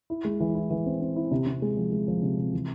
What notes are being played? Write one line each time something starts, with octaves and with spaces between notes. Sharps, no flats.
E4
G#3
E3
E4
E3
C4
C4
E4
C3
C3
G#3
F3
G#3
F3
C3
C3
E3